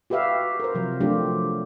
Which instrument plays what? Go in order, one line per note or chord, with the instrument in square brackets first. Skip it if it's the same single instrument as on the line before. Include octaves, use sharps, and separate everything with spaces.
[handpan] F#4 G4 B4 E5 F5
A#4 C5
C3 F3 F#3
F3 F#3 A3 D4 F4 G4